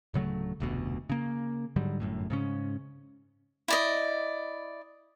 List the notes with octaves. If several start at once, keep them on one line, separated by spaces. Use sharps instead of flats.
D1 C#3 F#3 A3
F1 D2 B2
C#3 A#3
G#2 D3 F#3 G3
G1 F#2 A2
G#2 C#3 C#4
E4 D5 D#5